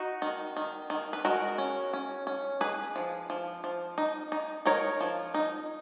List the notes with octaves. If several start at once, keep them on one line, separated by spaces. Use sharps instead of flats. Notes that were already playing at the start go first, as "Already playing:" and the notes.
Already playing: D#4 F#4
D#3
D#3
D#3
B4
G#3 F#4 A#4
C#4
C#4
C#4
D#4 G#4 B4
F3
F3
F3
D#4
D#4
D#4 A#4 C#5
F3
D#4